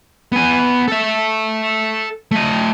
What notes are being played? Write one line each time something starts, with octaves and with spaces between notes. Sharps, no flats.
B3 G#5
A4 E5
A3 D#5